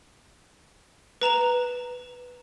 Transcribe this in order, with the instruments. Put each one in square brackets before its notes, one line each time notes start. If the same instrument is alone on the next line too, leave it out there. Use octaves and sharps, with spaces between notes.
[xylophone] B4 A#5 E7 F7